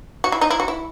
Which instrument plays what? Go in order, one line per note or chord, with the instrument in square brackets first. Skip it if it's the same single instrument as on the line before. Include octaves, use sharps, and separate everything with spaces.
[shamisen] F#4
E4
D#4
E4
F#4
E4